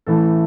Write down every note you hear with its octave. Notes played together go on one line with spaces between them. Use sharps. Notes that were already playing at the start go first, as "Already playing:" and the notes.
A1 A2 E3 A3 A4